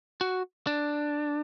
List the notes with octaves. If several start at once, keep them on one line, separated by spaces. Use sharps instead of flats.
F#4
D4